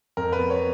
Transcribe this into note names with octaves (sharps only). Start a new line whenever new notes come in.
F2 A#4
B4
B3
C#5